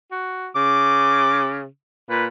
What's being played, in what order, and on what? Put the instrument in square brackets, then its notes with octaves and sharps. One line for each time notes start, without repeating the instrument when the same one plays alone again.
[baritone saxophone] F#4
[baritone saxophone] C#3 [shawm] D6
[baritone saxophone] A#2 [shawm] B4